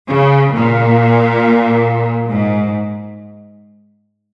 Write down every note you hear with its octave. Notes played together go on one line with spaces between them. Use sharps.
C#3
A#2
G#2